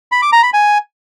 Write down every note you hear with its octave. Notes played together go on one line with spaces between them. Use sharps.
B5
D6
A#5
B5
G#5